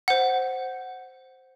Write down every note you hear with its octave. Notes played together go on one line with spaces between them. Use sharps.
C5 F#5